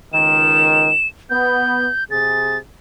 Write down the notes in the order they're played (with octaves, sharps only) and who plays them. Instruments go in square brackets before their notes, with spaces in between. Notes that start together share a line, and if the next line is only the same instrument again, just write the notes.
[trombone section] C#2 D#3 [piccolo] E7
[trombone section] B3 [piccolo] G6
[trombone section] C3 G#4 [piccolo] A6